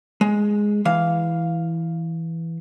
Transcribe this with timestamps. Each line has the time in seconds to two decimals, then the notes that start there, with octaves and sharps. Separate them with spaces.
0.21 G#3
0.85 E3 F5